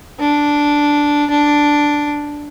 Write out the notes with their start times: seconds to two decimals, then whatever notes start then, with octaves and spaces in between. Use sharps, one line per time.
0.19 D4
1.30 D4